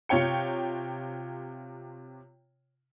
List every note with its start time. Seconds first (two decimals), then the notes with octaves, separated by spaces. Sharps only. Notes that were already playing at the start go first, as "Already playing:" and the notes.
0.09 C3 F4 C#5 G5 C#7